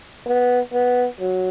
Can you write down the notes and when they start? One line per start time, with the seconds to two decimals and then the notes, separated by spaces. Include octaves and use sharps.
0.27 B3
0.74 B3
1.21 F#3